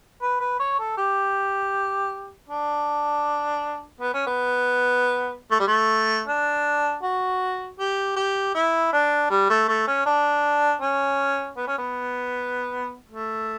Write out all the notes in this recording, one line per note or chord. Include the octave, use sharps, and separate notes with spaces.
B4
B4
C#5
A4
G4
D4
B3
C#4
B3
A3
G3
A3
D4
F#4
G4
G4
E4
D4
G3
A3
A3
C#4
D4
C#4
B3
C#4
B3
A3